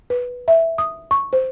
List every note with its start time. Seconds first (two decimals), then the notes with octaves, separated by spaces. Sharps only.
0.10 B4
0.48 E5
0.78 D#6
1.11 C#6
1.33 C5